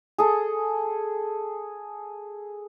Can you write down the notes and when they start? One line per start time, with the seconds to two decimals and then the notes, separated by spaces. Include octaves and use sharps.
0.18 G#4 A4